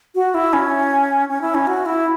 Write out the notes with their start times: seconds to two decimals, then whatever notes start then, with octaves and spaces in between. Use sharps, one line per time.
0.15 F#4
0.34 E4
0.53 C#4
1.29 C#4
1.41 E4
1.54 C#4
1.67 F#4
1.86 E4